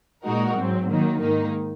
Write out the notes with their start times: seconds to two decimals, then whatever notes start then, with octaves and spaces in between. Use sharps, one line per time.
0.25 A#2 G#3 D#4 F#4 A#4
0.57 G#2 F#3 C4
0.89 D#3 F#3 A#3 D#4
1.20 G#2 D#3 A#3 D#4